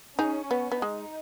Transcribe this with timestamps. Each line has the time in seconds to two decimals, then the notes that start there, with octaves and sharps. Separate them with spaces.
0.19 C#4 D#4 G#4
0.51 B3
0.72 B3
0.82 G#3 D#4